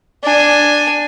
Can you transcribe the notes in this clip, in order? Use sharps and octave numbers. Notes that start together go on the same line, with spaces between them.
D4 G#5